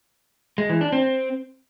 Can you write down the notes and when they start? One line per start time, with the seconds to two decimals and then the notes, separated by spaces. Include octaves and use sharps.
0.58 G#3
0.70 E3
0.81 D4
0.92 C4